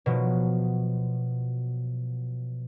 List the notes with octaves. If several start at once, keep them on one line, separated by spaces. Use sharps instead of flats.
B2 F3 F#3